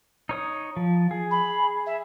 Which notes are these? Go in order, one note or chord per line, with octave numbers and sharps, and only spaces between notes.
D#4 C#5 D#6
F3
G#4
B5
E5